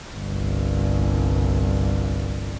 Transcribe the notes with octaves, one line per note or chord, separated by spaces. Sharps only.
G1 C2